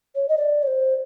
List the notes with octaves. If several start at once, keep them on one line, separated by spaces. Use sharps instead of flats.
C#5
D#5
D5
C#5
C5